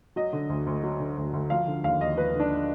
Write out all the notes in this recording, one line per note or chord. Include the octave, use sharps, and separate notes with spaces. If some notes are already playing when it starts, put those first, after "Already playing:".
F#3 D#5
D3
D2
D2
F#3
D3
D2
D2
F3 F5
D3
D#2 F5
D#2 D#5
F3 B4
D3
D4